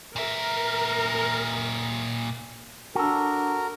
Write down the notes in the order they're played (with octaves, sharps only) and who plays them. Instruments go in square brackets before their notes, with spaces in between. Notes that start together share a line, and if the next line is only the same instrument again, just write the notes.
[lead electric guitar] A#2 E5 [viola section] A#4
[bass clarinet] D4 [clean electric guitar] F#4 A4 [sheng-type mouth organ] A#4